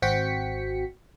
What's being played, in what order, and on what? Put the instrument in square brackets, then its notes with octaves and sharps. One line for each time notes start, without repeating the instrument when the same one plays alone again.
[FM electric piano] G#1 C4 F#4 G5 B6 C#7